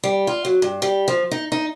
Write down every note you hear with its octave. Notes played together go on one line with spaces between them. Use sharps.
G3
F4
F#3
G2
G3
F3
D#4
D#4